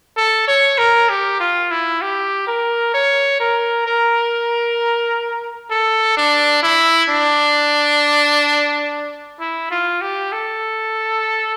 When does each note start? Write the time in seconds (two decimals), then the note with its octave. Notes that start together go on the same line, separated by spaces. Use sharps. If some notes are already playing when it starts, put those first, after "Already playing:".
0.17 A4
0.48 C#5
0.78 A#4
1.09 G4
1.40 F4
1.71 E4
2.02 G4
2.47 A#4
2.94 C#5
3.40 A#4
3.86 A#4
5.71 A4
6.17 D4
6.63 E4
7.09 D4
9.40 E4
9.71 F4
10.01 G4
10.32 A4